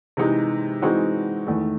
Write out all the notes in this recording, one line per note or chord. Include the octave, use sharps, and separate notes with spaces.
C3 E3 G#3 D#4
E3 G#3 C4 D#4 F#4
E2 D#3 A3